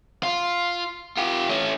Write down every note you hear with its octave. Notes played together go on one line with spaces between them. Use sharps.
F4
F4 G4
A3 C#4